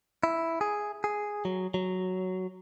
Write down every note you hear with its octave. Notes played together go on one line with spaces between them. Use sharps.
E4
G#4
G#4
F#3
F#3